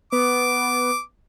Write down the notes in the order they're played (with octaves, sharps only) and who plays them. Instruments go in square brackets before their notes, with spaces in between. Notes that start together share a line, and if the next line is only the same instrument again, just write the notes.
[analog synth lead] B3 [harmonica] D6